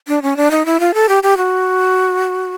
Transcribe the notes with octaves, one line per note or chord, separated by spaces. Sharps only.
D4
C#4
D4
D#4
E4
F4
A4
G4
G4
F#4